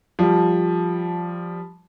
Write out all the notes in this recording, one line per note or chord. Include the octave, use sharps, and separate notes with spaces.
F3 G3